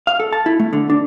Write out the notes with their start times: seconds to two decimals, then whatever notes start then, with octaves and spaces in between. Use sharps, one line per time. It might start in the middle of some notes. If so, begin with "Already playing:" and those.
0.07 F5
0.20 A4
0.33 A5
0.46 E4
0.60 A3
0.73 D3
0.90 D4